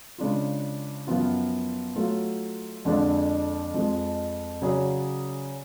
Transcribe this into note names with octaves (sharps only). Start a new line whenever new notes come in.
C#3 G#3 D4 F4
F#2 F3 B3 F4
F#3 A3 F4
F2 D3 G#3 D4 F4
F2 F3 G#3
C#3 F#3 C#4 G#4 D5